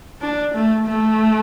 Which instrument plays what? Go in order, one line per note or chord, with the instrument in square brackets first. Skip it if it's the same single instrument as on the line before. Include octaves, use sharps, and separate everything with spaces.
[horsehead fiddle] D4
A3
A3